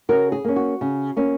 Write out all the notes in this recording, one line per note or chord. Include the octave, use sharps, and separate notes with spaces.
C#3 F#4 A#4
G#4
A#3 C#4
F#4
C#3
A#3 C#4